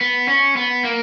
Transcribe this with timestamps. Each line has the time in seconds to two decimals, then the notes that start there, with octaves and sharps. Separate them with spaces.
0.01 B3
0.28 C#4
0.56 B3
0.84 A#3